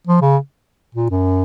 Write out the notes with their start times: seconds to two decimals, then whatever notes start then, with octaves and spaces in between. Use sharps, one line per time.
0.07 F3
0.22 C#3
0.95 A#2
1.10 F#2